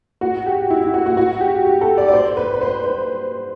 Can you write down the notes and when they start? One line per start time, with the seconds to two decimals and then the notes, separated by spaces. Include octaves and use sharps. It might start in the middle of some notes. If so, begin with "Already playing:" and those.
0.21 F#4
0.46 G4
0.70 E4
0.81 E4
0.94 F#4
1.06 F#4
1.17 F#4
1.41 G4
1.65 G4
1.81 A4
1.98 D5
2.08 D5
2.13 C5
2.37 B4
2.54 B4
2.61 C5
2.84 C5